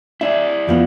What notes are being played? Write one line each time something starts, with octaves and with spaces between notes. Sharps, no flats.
E4 D5 E5
F2 F3 B3